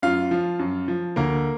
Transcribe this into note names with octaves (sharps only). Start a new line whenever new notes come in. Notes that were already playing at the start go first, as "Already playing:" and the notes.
F#2 F4 F5
F3
F#2
F3
D2 A#3 A#4